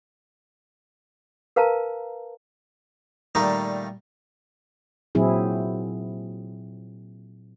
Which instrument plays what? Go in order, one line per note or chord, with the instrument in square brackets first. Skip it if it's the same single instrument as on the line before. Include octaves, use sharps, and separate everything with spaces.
[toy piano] A#4 B4 F5 A5 A#5
[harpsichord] A#2 D#3 G3 A3 D#4
[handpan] A#2 F#3 C4 E4 G#4